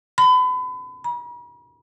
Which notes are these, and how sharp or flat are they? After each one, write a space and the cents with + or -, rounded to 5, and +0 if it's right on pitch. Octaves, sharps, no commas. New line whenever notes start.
B5 +35
B5 -45